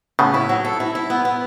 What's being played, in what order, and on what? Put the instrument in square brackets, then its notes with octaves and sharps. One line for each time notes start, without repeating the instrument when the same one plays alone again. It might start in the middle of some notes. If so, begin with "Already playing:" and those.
[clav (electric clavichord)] A2 C#3 [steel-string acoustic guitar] B3
[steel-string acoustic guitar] E4
F#3
A4
E4
E4
B3
B3